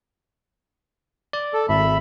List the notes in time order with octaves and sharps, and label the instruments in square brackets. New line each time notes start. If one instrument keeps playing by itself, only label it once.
[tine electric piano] D5
[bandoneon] A4
[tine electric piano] G#1 [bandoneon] E5 B5